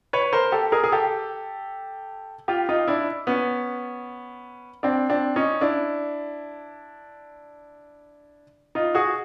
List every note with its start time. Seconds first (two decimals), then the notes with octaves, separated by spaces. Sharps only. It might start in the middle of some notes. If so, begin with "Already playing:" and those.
0.13 B4 C#5
0.33 A#4 C5
0.52 G4 A4
0.72 G#4 A#4
0.84 G#4
0.92 G4 A4
2.48 F4 G4
2.69 D#4 F4
2.88 D4 E4
3.27 B3 C#4
4.83 C4 D4
5.10 C4 D4
5.36 C#4 D#4
5.61 D4 E4
8.75 D#4 F4
8.95 F#4 G#4